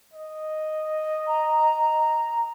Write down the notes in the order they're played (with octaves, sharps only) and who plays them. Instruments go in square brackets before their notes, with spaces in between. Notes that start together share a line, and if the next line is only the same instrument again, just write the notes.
[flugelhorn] D#5
[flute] A#5